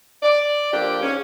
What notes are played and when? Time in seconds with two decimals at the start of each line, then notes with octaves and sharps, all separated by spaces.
0.22 D5
0.71 D3 F3 A#3 D4 G4
1.02 G#2 C#4